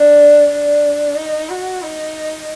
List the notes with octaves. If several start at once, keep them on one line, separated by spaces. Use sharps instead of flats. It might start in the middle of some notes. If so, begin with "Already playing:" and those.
Already playing: D4
D4
D#4
F#4
D#4